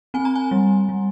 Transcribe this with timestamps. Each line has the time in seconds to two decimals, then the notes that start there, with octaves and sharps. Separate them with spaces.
0.14 C4 G#5
0.25 A#5
0.35 G#5
0.51 G3
0.89 G3